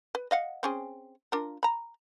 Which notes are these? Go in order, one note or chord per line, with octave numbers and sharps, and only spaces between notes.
B4
D#5 F5 F#5
C4 C#4 G#4
D4 F4 A#4
A#5 B5